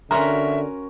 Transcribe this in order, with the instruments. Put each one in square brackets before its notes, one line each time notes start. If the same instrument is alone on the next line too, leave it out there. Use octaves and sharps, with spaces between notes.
[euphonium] D3 [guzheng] C#4 F#4 A#4 [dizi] E5 [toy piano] A#5 C6